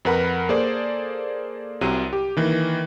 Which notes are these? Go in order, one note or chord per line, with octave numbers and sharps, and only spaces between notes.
F2 A#4 B4 F#5 A#5 B5
A#3 G#4 A4 C5 D5
C2 C3 F#3 D#7
G4
D#3 E3 A#3